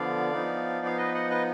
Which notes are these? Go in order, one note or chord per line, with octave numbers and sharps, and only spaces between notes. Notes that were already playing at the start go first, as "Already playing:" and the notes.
Already playing: D3 F3 B3 D5 F5
F3 B3 D#4
F5
B4 D#5
D#5 F#5
B4 D#5